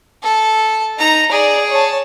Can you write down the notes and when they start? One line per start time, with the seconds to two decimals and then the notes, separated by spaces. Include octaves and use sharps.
0.23 A4
0.99 D#4 A#5
1.32 G#4 D5
1.71 C#5 A5